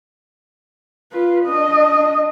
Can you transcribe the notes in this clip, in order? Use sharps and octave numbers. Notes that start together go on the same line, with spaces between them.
F4 B4
D4 D#5